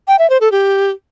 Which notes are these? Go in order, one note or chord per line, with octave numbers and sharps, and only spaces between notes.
G5
E5
C5
A4
G4